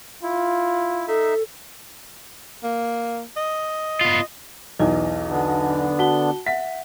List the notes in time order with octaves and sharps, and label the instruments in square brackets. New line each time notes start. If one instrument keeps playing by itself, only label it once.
[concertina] E4 [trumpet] F4
[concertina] D#4 E5 [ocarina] A4
[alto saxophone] A#3
D#5
[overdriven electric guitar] B3 F4
[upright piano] B1 E2 [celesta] D#5
[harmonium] D3 B3 D4
[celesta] F#4 A5 G7 [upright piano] F#5
[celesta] E5 F#5 [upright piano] B6